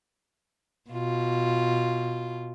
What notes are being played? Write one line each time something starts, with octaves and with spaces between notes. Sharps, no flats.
B2 F4